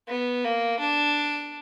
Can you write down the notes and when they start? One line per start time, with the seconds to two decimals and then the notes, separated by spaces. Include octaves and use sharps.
0.08 B3
0.44 A#3
0.80 D4